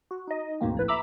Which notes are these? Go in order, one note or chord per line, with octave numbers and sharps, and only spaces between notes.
F#4
D#4 D#5
D2 G#2 B2 A#3 C4
A#1 A2 B4
E5 A#5 B5 D6 E6